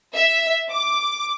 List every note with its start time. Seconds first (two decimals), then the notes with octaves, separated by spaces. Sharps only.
0.15 E5
0.70 D6